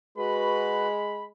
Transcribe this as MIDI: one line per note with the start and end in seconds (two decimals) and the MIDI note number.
0.18 1.30 56
0.18 0.87 66
0.18 0.87 71
0.18 1.24 83